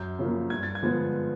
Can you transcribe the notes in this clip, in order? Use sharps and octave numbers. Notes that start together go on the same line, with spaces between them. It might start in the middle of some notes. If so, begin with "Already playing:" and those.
Already playing: F#2 G6
C#3 F3 A#3
G2 G#6
A6
G#6
D3 F3 G#3 B3